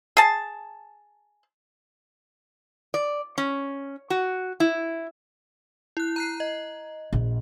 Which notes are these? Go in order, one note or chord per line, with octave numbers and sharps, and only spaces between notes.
G#4 A5
D5
C#4
F#4
E4
E4 F#6
A#5 F#6 C7
D#5
A#1